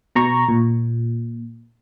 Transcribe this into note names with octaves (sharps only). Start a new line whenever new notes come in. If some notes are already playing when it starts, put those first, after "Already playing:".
B2 A#5 C#6
A#2